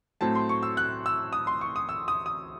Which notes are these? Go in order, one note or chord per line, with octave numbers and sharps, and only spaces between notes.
A2 F#3 A3 C4 A5
C6
C#6
E6
F#6
E6
D#6
C6
C#6
D#6
E6
D#6
D#6